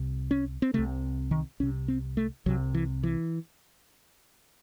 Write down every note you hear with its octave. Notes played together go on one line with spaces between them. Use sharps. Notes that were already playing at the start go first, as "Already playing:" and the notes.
Already playing: C2 C3
C#4
C4
C3 A3
C2
D#3
C2 C3 C#4
C4
A3
C2 C3 F#3
E3
E3